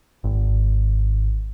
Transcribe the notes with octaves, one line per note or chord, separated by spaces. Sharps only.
G#1